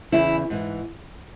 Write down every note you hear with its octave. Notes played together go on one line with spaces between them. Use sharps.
E2 C#3 E3 E4
G#2 E3